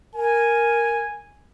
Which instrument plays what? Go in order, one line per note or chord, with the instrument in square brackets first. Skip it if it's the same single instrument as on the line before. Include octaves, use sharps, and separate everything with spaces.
[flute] A#4 [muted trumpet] G#5